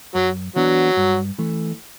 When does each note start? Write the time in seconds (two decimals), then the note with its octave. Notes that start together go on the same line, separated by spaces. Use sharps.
0.15 F#2 F#3
0.56 E3 F#3 B3 D4 F#4
0.97 G2
1.39 E3 A3